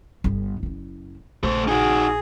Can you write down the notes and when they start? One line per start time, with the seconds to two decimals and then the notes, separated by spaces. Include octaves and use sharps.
0.24 G1 B3
0.63 F#1 E4
1.43 A#1 A3 C5
1.68 D#4 F#4 G#4